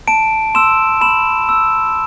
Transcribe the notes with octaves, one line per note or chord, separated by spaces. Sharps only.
A5 D7
C6 E6 E7
B5 E7
E6